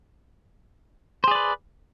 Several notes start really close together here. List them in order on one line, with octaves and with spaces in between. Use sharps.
C5 G#4 D5 B4